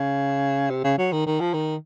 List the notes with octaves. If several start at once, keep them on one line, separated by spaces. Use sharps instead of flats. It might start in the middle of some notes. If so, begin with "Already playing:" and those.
Already playing: C#3
C3
C#3
F#3
D#3
D#3
F3
D#3